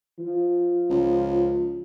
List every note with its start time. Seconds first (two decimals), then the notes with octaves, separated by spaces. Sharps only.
0.19 F3
0.90 C#2